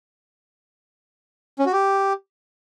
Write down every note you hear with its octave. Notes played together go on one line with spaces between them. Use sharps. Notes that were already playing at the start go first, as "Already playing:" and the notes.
C#4
F#4
G4